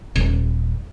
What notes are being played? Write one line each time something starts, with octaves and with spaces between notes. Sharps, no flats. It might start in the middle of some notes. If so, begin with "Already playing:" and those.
D#1